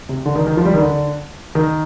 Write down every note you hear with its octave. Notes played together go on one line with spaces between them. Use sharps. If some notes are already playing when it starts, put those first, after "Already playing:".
C3
D3
D#3
D#3
F3
G3
D#3
D3
D#3